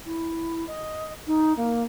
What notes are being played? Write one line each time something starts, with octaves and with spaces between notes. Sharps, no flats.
E4
D#5
D#4
A#3